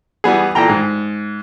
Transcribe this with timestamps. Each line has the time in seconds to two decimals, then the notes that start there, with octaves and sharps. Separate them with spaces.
0.24 E3 G3 B3 G#4
0.55 A#2 E3 A4 G5 A#5
0.69 G#2